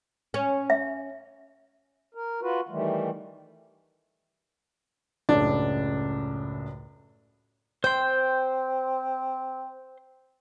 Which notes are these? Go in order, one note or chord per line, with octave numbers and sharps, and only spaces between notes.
C#4
E5
A#4
F4 F#4 B4
D#3 E3 G3 A3
C#2 F#2 A2 D4
C4 C5 G5 C6